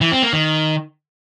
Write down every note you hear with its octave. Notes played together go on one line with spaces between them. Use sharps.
E3
C4
A#3
D#3